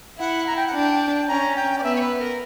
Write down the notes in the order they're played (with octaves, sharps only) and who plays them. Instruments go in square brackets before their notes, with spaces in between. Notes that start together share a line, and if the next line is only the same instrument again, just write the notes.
[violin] E4 [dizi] F#5
[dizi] A#5
G5
F#5
[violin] D4 [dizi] G5
[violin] C#4 [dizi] A#5
[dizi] G5
D5
[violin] B3 [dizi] E5
[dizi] C#5
B4
A#4